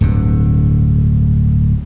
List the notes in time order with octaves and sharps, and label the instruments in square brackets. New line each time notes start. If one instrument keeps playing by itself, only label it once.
[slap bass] D1 G2 D3